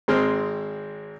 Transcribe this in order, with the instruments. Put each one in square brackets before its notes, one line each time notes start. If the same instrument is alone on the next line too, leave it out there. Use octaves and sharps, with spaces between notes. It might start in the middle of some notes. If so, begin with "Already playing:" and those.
[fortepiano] G#1 G#3 C4 C5 F6